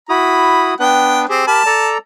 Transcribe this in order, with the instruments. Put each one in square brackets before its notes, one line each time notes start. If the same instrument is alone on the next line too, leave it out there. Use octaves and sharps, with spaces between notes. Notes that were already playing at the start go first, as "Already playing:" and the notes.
[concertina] E4 F#4 D#6 [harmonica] B5
[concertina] B3 D4 B4 [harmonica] G5
[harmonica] C4 [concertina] G4 G#4
[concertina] G4 A#4 B5 [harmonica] A5
[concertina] A4 D5 A#5